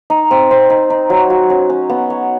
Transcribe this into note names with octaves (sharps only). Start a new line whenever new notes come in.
D#4
C4
C4
D#4
D#4
F#3
F#4
C#4
C#4
B3
C#5